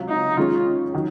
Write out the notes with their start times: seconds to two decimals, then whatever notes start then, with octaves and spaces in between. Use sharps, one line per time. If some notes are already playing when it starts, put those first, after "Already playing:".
Already playing: C#2 C3 F#3
0.09 D#4
0.37 D#3 G#3 C#4 F4
0.94 D#3 F#3